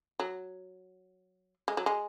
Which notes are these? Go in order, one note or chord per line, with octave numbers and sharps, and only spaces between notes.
F#3
G#3
F#3
G#3